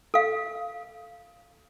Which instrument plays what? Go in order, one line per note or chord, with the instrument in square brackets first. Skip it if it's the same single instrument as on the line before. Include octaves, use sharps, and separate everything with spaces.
[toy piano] A4 F5